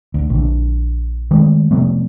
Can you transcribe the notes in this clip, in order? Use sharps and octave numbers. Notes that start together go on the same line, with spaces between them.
D2
A#1 D3
D#3 G#3 A3
C3 F3 A3 B3